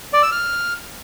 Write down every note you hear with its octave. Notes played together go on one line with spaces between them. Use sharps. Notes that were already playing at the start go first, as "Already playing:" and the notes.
D5
E6
F6